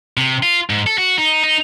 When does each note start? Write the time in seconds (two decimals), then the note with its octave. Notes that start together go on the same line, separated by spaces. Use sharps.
0.17 C3
0.43 F4
0.70 G#2
0.87 A4
0.98 F#4
1.18 D#4
1.44 D#4